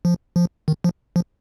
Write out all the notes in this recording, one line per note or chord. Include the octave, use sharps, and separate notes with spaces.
F3
F3
D#3
F3
F3